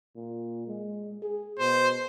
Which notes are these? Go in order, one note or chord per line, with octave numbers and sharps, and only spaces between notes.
A#2
G#3
G#4
B2 C5